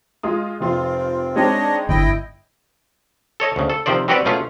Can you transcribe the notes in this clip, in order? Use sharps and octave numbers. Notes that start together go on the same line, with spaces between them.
G#3 F4 D#6
F1 C4 F4 C6
G#3 C4 D4 D#4 C#5 D#5
G1 E4 D#5 G5
A4 C#5 D#5 A5
D2 C#3
A4
C3 D#3 F3 C5 D5
G3 C4 F#4 G4 B4 D5
B2 A3 C#4 F4 G#4